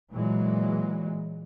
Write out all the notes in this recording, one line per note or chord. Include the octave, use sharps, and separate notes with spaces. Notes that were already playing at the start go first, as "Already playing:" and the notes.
A#2 E3 F#3 G#3